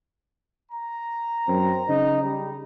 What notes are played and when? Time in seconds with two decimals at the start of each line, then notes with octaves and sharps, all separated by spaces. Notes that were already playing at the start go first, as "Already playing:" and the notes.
0.72 A#5
1.48 F#2 C4
1.88 C#3 D#4
2.23 G3